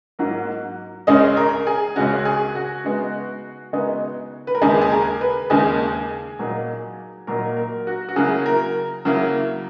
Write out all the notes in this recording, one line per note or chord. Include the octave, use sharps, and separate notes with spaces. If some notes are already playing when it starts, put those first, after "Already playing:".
G#2 F#3 A#3
C#2 C#3 G#3 C#4 D#5
A#4
G#4
C#2 C#3 G#3 C#4 F#4
G#4
F#4
C#3 G#3 B3 D#4
C#3 G#3 B3 D#4
B4
A#4
D#2 C#3 G#3 G#4
G#4
A#4
B4
D#2 C#3 G#3 G#4
A#2 F#3 A#3 D#4
A#2 F#3 A#3 D#4 A#4
A#4
F#4
F#4
C#3 F#3 A#3 E4 G#4
A#4
C#3 F#3 A#3 E4